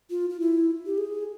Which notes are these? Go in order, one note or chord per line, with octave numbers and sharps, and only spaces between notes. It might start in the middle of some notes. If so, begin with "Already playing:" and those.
F4
F4
E4
G4
G#4